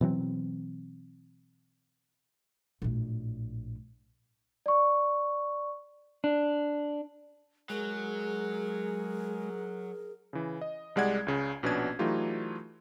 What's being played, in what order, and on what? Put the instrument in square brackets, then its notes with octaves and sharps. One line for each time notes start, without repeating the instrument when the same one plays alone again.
[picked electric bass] B2 E3 F#3 C4
[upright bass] A#1 A2
[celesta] D5 C#6
[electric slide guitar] D4
[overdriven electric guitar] F#3 [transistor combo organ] G#3 [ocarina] G#4 [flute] A#4
[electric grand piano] C#3 E3
D#5
C2 G3 G#3 D5 F#5 G#6
C#2 C#3
A#1 B2 B3 C#4 D4 G#6
E3 F#3 A3 D#4 F4 G4